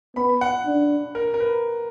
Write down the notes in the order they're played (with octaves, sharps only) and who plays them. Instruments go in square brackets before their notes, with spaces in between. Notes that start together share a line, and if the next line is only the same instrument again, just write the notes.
[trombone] B3 [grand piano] B5
[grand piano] F#5
[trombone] D4
[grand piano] A#4
A#4
B4